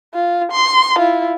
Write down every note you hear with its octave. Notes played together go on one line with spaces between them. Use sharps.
F4
C6
E4 F4